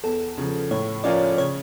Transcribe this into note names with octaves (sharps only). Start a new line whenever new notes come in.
E2 A4
C#3 F3
A2 C#5
F3 C#4 F4 A#4 D5
C#3 C#5